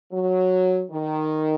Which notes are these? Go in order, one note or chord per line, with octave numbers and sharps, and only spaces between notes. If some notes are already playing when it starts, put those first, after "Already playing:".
F#3
D#3